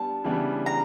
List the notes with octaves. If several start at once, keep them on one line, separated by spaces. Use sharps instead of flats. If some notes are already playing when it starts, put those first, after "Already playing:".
Already playing: G3 B3 D4 A5
C#3 E3 G3 B3 D4
A#5